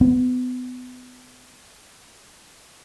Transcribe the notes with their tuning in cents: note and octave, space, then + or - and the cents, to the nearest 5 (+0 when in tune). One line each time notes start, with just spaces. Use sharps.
B3 +30